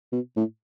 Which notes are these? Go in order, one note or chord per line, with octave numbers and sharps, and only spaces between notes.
B2
A2